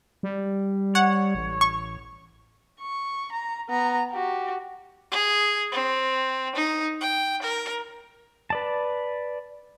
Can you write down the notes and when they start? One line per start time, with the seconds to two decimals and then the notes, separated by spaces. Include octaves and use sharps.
0.23 G3
0.95 C#5 F#5
1.35 A1
1.61 C#6
2.81 C#6
3.32 A#5
3.69 B3 A#5
4.11 F#4 G4
5.12 G#4
5.72 C4
6.56 D#4
7.01 G5
7.42 A#4
8.50 B4 D5 A5